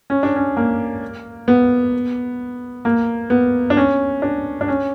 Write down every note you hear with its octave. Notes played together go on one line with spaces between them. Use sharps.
C#4
D4
C#4
A#3
B3
A#3
B3
D4
C#4
D4
D4
C#4